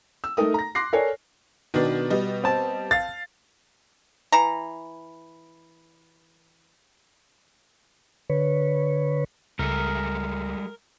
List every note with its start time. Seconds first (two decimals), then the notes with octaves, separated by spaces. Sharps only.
0.24 E6
0.37 A3 D#4 A4 A#4 D#6
0.54 A#5 A#6
0.75 C6 D6 F#6 A#6 C7
0.93 A4 A#4 C#5 D5 G#5
1.74 B2 D#3 B3 D4
2.10 G3 B3 D#5
2.44 C4 A5
2.91 F5 A6
4.32 E3 A#5
8.30 D3 B4 C#5
9.59 C#2 G3 G#3 A4 A#4